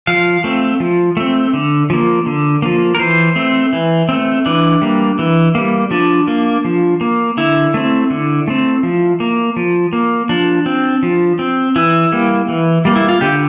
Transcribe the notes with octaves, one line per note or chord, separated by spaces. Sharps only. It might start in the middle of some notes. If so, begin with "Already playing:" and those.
F3 F5
A3 C4
F3
A3 C4
D3
F3 A#3
D3
F3 A#3
A#4
E3 C5
A3 C4
E3
A3 C4
E3 D4
G3 A#3
E3
G3 A#3
F3 D4
A#3
F3
A#3
D3 E4
A3 C4
D3
A3 C4
F3
A#3
F3
A#3
F3 D4
C4
F3
C4
E3 E4
G3 A#3
E3
G3 A#3
E4
F4
D3 G4